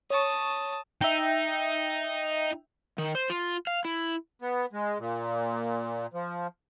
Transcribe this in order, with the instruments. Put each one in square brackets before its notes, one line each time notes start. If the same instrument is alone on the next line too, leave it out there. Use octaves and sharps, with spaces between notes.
[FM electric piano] C#5 C#6 [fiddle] A5 D#6
[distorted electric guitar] D#4 [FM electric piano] E5 G5
[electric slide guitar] D#3
C5
F4
F5
E4
[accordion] B3
G#3
A#2
F3